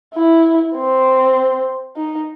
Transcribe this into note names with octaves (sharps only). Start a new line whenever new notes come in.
E4
C4
D#4